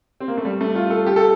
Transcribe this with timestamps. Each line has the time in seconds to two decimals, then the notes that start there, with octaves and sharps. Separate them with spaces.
0.20 C4
0.28 A#3
0.37 A3
0.45 G3
0.61 A3
0.75 F4
0.90 A4
1.06 G4
1.16 A4